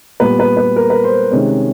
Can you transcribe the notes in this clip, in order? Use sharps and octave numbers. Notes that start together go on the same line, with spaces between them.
A#2 G3 B3 B4
B4
B4
A#4
B4
C5
C3 D#3 G#3 C#4